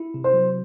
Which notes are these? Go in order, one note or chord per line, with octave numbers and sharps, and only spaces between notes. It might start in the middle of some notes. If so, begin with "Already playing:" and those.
Already playing: E4
C3
C5
F#3